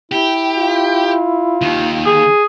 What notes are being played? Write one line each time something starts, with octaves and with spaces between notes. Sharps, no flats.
E4 G4
F4
D#2 D#3
G#4